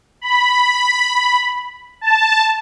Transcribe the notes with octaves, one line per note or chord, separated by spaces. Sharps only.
B5
A5